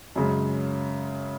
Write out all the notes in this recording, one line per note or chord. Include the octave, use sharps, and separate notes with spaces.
F#2 C#3 G#3